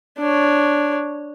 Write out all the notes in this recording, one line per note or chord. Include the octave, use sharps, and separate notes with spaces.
D4 C#5